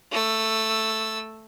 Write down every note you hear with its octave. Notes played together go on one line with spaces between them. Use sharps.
A3 E6